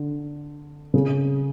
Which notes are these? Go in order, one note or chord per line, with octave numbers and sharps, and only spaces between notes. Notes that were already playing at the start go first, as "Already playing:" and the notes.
Already playing: D3
C#3